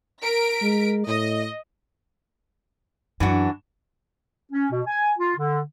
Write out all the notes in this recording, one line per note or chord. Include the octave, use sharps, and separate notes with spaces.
A#4 B6 D7
G#3
A2 D#5
F#2 E3 D4 F#4
C#4
B2
G#5
F4
D3